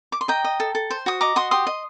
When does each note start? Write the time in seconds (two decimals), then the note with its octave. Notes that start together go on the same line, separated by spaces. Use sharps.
0.12 D6
0.21 C6
0.28 D#5 G5 A#5
0.44 D#5
0.60 A4
0.75 A4
0.90 C5
1.06 F#4 D#6
1.21 D#5 A#5 D6
1.36 F#4 C6 D#6
1.51 G4 C6 D#6
1.67 D#5